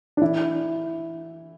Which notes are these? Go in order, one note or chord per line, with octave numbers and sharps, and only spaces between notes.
D4
E3 E4